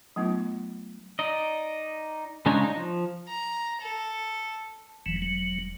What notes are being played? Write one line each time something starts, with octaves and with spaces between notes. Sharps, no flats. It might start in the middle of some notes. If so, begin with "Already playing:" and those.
F#3 A3 B3 D#4 F4
D#4 D5 D#5
C#3 G#3 D4 D#4 C#5
D#4
F3
A#5
A4
E1 E3 F#3
F#3